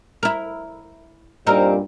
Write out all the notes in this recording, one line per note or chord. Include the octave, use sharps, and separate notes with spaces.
E4 A#4
G2 A#2 G3 C4 D#4 A#4